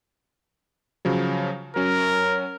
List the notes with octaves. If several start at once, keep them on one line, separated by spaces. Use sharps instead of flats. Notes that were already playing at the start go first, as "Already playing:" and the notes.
C#3 F3 F#3
F#3 C#4 A#4